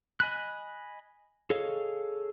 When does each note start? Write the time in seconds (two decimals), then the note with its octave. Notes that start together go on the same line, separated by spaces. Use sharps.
0.20 D#5 G#5 B5 F#6
1.50 G#4 A4 C#5 D#5 F5